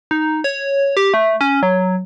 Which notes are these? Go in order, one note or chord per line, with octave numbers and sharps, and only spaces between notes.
D#4
C#5
G4
A3
C#4
F#3